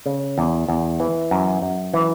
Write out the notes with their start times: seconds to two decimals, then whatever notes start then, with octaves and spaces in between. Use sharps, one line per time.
0.06 C#3
0.38 E2
0.68 E2
1.00 E3
1.31 F#2
1.62 F#2
1.94 E3